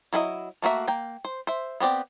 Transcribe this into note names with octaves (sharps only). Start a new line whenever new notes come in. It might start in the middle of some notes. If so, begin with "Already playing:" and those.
F#3 E4 A4 D#5
A3 A#3 F#4 E5
A#3 G5
C5
C5 E5
B3 C4 G4 D5